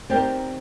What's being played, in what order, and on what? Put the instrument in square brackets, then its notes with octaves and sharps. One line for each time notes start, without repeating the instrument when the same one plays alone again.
[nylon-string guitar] C4 [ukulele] D#4 G4 A#4 D5